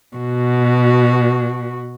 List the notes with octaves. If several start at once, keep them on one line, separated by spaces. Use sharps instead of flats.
B2 F#4